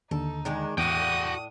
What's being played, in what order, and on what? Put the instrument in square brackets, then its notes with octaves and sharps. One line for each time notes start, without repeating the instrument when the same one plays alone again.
[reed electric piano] D#2 D3 [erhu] D#4 [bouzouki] A4
[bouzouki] D#3 G#3 D4
[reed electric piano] E2 [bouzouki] A2 D4 [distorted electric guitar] F#4 G5 [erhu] D#6